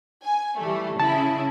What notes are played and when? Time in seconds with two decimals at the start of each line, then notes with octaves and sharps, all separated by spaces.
0.25 G#5
0.59 E3 G3 A3
1.00 C#3 E4 A5